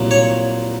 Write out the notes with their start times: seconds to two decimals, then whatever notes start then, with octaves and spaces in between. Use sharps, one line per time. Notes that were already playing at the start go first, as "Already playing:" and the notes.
Already playing: C2 A#2 F#3
0.11 C#5